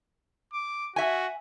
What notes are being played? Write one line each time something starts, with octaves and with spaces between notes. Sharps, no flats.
D6
F#4 E5 G#5